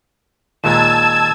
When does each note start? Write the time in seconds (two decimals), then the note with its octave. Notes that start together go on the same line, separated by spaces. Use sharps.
0.64 D#2 A#2 G#3 A5 E6 G#6 E7